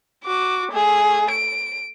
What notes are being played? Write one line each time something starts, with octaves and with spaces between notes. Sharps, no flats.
F#4 D6
A3 G#4
D7